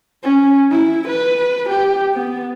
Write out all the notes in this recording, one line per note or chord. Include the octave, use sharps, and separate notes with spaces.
C#4
E4
B4
G4
B3